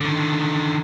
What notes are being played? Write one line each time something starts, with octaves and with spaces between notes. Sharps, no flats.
D3 D#3